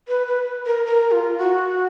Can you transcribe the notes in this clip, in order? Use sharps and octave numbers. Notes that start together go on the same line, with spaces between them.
B4
B4
A#4
A#4
F4
F#4